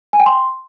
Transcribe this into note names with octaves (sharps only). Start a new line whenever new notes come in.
G#5
G5
C6